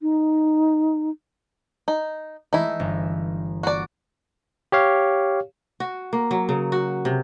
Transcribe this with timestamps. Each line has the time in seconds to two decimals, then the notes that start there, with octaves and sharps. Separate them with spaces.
0.01 D#4
1.88 D#4
2.53 E3 G#3 A3 D#4 E4
2.80 G1
3.63 A#3 F#4 D5
4.72 G4 C#5 F5
5.80 F#4
6.13 A#3
6.31 F#3
6.49 C#3
6.72 F#4
7.05 C3